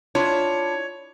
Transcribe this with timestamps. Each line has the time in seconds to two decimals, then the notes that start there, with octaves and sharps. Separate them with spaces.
0.15 D4 E4 F4 C#5